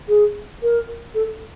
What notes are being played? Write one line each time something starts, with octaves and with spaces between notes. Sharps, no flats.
G#4
A#4
A4